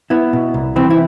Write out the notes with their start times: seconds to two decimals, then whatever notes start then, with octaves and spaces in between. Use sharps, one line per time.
0.10 B3 E4
0.33 B2
0.54 C2
0.76 E3 C4
0.90 E4